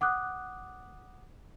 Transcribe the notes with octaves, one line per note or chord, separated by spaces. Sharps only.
F#5 D6 D#6 F#6